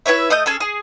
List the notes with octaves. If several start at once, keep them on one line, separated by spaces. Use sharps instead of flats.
E4 B4 C#5 E5
A3 D#5 D#6 G6
C#4 G#4 A4
G#4